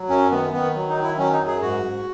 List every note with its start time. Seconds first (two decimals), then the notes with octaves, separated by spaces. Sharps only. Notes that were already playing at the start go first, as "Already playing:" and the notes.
Already playing: F#3
0.09 F#2 C#4
0.31 D#3 B3
0.53 D#3 B3
0.75 F#3
0.89 D#4
0.97 D#3
1.03 E4
1.18 F#3 C#4
1.33 D#4
1.40 F#2
1.47 G#4
1.61 G#2 F#4
1.83 G#2